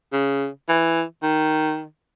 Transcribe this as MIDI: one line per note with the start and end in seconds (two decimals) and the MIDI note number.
0.12 0.48 49
0.69 1.03 52
1.22 1.84 51